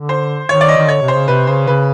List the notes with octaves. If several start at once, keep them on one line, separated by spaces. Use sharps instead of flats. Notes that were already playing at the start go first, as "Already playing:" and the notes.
Already playing: D3
C5
D#3 C#5
D5
D#5
D#3
D3 C#5
C3
C5
C#3
C3 B4
C#3 C5
C#3 B4